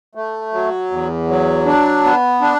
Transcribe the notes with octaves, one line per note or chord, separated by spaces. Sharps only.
A3
F#3
E2
F#3
D4
B3
D4